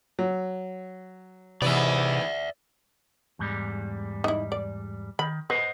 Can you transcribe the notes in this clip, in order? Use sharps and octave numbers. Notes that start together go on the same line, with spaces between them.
F#3
G#2 C3 E3 B3 D5 E5
E2 G#2 G3
D#4 E4
D5
D#3 B5
B4 C5 D#5 F#5